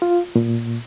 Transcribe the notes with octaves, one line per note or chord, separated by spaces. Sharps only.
F4
A#2